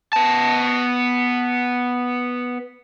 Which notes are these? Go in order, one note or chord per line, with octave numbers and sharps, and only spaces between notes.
B3 A5